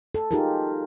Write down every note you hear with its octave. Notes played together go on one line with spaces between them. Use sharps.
A4
D#4 F4 G4 G#4 A#4